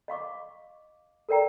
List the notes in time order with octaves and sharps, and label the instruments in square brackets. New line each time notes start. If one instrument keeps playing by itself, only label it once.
[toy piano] D#5 F5 C#6 D6
A4 A#4 D5 G5 A#5